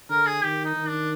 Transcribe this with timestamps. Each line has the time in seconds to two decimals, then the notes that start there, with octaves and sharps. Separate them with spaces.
0.09 D3 A#4
0.26 G#4
0.44 D#3 G4
0.65 D#4
0.76 D#3
0.88 D4